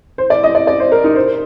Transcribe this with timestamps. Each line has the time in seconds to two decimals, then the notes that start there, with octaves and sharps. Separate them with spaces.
0.18 C5
0.30 D5
0.44 D#5
0.55 D5
0.67 D5
0.80 C5
0.92 A#4
1.04 D#4
1.15 C5